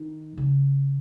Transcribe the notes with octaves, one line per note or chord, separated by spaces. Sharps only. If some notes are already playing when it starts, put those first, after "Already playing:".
Already playing: D#3
C#3